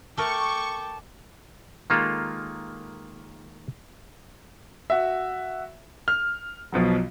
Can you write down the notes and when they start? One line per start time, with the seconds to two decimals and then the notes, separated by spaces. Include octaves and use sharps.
0.18 A3 A#4 G5 A5 C#6 D6
1.90 D#3 G#3 A#3 F4 A4
4.90 F#4 E5
6.08 F6
6.72 B1 B2 F3 F#3